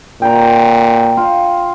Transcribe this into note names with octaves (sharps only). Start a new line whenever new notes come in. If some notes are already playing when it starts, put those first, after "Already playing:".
A#2 G5 A#5
F4